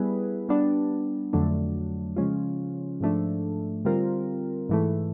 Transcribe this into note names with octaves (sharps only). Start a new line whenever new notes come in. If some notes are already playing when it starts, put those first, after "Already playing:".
Already playing: G3 B3 E4 G#4 B4
G3 B3 D4
F2 D3 F#3 A3 D4
C#3 F3 G#3 C#4 F4
G#2 F3 A3 D4
D3 G3 C4 F4 A#4
G#2 E3 A3